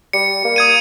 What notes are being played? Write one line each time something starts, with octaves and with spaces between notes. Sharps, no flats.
G3 C#7
A#3
D#6 G#6 D#7